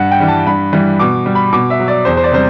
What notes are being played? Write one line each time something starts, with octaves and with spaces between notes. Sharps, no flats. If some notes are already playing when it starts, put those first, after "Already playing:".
Already playing: G2 F#5
G5
E3 G3
A5
G2 B5
E3 G3
B2 D6
G3
B5
B2 D6
E5
F#3
D5
E2 C5
C5
D5
C3 G3 C5